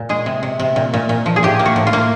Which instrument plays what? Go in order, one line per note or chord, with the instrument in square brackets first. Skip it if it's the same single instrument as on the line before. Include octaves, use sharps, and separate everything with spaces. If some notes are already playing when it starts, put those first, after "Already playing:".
Already playing: [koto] A#2
G#3 G#4
C3
C3
C3
A#2
A#2
A#2
F3
G#4
A2 G4
A#3
F#4
A2
F4
A#3